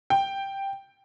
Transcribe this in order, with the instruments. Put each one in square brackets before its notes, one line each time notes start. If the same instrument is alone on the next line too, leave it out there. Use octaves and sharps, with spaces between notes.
[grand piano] G5